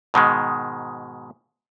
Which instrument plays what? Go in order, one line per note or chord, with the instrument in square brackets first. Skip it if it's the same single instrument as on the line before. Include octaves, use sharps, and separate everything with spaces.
[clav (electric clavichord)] G#2 B2 D#3 G#3